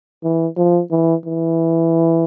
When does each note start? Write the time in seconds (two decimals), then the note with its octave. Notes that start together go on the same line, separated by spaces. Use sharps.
0.24 E3
0.57 F3
0.91 E3
1.26 E3